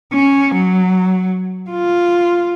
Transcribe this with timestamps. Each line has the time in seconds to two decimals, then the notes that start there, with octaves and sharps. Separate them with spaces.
0.13 C#4
0.55 F#3
1.70 F4